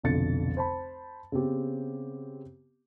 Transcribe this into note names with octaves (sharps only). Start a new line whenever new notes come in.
F1 B1 F2 D3 A6 C#7
C5 A5 B5
C#3 B3 C4 G4